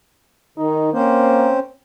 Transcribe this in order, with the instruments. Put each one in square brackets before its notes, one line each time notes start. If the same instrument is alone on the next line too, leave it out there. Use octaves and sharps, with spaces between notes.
[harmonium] D#3 [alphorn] D#4
[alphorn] A#3 [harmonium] C4 C#4 C5